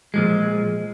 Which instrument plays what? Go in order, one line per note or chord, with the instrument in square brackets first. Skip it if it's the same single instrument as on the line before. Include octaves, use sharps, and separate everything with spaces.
[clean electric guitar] A#2 F3 G#3